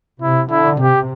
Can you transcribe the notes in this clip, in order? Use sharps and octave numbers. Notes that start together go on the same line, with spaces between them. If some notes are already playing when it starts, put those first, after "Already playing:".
C3 E4
D3 E4
C3 G4